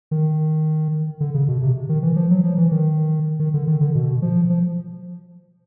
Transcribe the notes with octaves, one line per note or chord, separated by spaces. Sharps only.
D#3
D3
C#3
B2
C3
D#3
E3
F3
F#3
F3
E3
D#3
D#3
D3
D#3
D3
B2
F3
F3